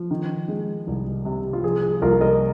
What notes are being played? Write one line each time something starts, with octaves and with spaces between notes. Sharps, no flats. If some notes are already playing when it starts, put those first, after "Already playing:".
Already playing: F3
D#3
G#3
C2
C3
F4
F3 G#4
G#4
C2 F4 A#4
A#4 D#5